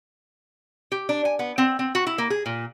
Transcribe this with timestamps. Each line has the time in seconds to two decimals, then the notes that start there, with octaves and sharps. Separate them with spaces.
0.92 G4
1.09 D4
1.25 G#5
1.39 B3
1.58 C4
1.79 C4
1.95 F#4
2.07 E4
2.18 A#3
2.30 G#4
2.46 A#2